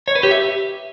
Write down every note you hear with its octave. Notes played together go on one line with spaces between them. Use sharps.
C#5
B4
G4
E5